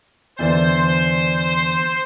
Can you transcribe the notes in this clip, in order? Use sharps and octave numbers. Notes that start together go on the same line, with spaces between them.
E2 D3 C5